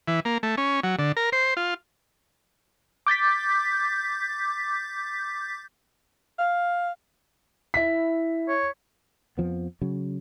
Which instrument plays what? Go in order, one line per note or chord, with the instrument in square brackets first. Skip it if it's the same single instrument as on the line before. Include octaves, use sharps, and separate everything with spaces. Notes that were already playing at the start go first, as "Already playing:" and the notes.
[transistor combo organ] E3
A#3
A3
C#4
F#3
D3
A#4
C5
F4
[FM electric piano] D6 G6 A6 B6
[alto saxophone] F5
[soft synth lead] E4 [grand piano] E5 B6
[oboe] C#5
[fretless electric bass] F2 F3 B3
C#3 F#3